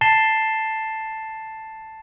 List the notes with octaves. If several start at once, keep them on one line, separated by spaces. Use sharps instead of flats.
A5 A6 C7 E7 G7